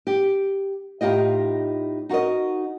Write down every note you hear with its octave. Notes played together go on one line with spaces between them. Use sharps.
G4
A2 D#4 F4 G4 D#5
D#4 F#4 G#4 A#4 D#5